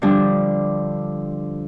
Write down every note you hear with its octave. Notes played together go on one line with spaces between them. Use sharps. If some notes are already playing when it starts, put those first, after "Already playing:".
D3 F3 G3 D4